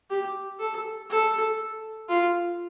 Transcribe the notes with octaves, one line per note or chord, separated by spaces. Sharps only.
G4
A4
A4
F4